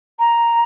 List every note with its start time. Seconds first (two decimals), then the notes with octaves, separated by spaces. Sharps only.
0.19 A#5